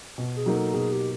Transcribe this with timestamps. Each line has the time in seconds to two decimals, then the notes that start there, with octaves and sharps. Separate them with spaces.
0.18 B2
0.36 G#4
0.46 F#3 A#3 D#4
0.56 A4
0.74 B2 G#4
0.92 G4